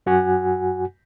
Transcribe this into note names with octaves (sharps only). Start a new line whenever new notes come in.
F#2 F#4 F#5 G#5